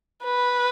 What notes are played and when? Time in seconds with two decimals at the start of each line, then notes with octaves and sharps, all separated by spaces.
0.24 B4